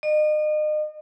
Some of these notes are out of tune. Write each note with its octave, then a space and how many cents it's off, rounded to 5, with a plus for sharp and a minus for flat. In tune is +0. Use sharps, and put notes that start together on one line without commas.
D#5 -35